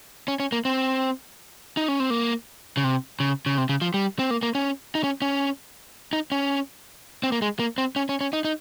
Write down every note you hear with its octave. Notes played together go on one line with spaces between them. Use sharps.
C#4
C#4
A#3
C4
D#4
C#4
C4
A#3
C#3
C3
C#3
C#3
C3
C#3
F3
G3
C4
A#3
A#3
C#4
D#4
C#4
C#4
D#4
C#4
C4
A#3
G#3
A#3
C4
C#4
C#4
C#4
D#4
D#4